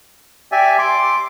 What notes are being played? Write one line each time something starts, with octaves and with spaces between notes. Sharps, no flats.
G4 D5 E5 G#5
C6 D6